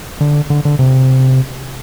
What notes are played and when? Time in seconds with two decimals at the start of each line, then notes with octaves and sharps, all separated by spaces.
0.21 D3
0.50 D3
0.65 D3
0.79 C3